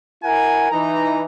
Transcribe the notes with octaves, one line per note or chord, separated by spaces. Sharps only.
E4 A#4 F#5 G#5
E3 D#4 A#5